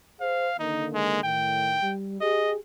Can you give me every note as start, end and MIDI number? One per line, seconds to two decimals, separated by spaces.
0.20 0.48 68
0.20 0.48 72
0.20 0.56 77
0.59 1.22 50
0.59 1.22 51
0.59 1.22 58
0.59 0.87 63
0.94 1.23 56
1.23 1.78 45
1.23 1.78 51
1.23 1.93 79
1.82 2.21 55
2.21 2.56 67
2.21 2.56 68
2.21 2.51 75